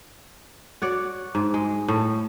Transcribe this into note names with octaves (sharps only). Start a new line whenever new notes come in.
F#4 C#5 D5
G#2
G#3
A2